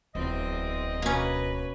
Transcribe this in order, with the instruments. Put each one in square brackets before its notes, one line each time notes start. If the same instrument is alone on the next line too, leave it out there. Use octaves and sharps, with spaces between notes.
[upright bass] D1 [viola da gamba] E2 C4 [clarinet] D#5
[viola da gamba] B2 B4 C#5 [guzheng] A#3 C#4